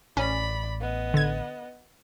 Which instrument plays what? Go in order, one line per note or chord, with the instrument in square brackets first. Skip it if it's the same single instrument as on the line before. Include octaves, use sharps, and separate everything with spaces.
[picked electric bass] A1 [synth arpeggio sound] C#4 [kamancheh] D5 B5
[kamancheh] B3 D#5
[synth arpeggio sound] D3 G#6